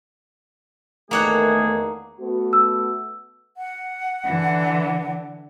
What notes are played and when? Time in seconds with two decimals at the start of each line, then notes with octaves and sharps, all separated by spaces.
1.11 E2 D#3 A3 A#3 G#4 C#5 F#5
2.20 A3 B3 F#4
2.53 E6
3.57 F#5
4.24 D3 E3